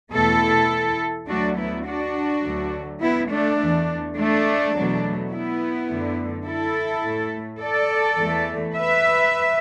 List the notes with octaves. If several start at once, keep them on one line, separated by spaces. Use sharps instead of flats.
E2 B2 A3 E4 A4
D2 D3 F#3 A3 D4 F#4
B3 E4
D4 F#4
D2 D3 F#3 A3
B3 E4
A3 D4
E2 E3 A3
A3 D4
E2 B2 F#3 A3
B3 E4
F#2 D3 A3
E4 A4
A2 A3
A4 D5
E2 E3 A3
B4 E5